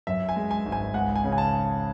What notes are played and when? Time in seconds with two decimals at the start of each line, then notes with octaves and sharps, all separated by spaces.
0.07 F#2 E5
0.29 G#5
0.36 G#3
0.51 G#5
0.66 G#1
0.72 G#5
0.94 C#2 F#5
1.16 G#5
1.24 C#3
1.32 G#5
1.38 A5